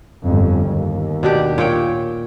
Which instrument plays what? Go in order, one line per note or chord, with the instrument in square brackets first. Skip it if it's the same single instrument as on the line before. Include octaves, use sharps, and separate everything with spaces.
[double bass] G1 F2
D#2
[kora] B2 D4 G4
A#2 C#5 G5